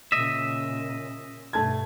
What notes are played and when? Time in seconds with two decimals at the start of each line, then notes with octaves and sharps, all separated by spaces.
0.12 A#2 C#3 D#5 E5
1.53 G2 B2 A3 A5 G#6